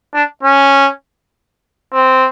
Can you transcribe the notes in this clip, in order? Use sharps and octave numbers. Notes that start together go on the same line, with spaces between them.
D4
C#4
C4